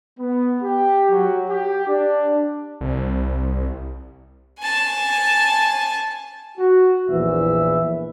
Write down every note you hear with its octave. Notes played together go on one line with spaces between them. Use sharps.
B3
G4
F#3
G4
D4
C2
G#5 A5
F#4
A#1 E2 E3 E5